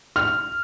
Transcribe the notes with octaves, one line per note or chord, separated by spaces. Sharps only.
F6